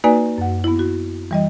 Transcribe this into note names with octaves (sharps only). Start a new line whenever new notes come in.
A#3 D#4 F#4 B4 D5 G#5
F#2 F#5
B3 E4
F#4
E3 G3 D#5